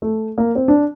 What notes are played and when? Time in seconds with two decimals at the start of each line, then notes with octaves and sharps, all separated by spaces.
0.02 A3
0.38 A#3
0.55 C4
0.68 D4